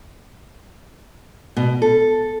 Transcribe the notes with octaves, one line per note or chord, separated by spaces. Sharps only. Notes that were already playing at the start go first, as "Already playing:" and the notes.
B2
A4